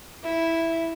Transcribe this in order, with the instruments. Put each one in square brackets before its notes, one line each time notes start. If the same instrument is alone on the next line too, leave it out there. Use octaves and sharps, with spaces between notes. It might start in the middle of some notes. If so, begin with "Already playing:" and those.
[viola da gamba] E4 [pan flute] E5